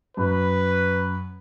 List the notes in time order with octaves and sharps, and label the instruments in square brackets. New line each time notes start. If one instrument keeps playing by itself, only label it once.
[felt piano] F#2 [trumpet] B4